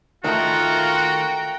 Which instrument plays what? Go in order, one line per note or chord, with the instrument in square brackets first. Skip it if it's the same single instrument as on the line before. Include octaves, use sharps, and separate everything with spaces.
[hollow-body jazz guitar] D#3 A3 [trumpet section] F4 [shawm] F#4 [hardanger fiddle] G5 A#5